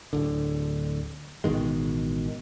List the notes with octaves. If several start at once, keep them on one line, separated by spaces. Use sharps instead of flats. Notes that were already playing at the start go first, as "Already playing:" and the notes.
D1 D3
A1 B2 D#3 G#3